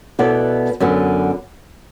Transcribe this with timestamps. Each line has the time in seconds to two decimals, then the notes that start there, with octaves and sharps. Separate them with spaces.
0.19 B2 B3 E4 A4 D5
0.80 F#2 D3 B3